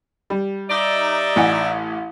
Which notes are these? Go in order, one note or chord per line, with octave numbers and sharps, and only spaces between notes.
G3
D#4 D5 E5
A1 F#5 G#5